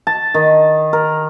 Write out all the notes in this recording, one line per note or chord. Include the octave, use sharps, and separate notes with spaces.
A5
D#3
A#4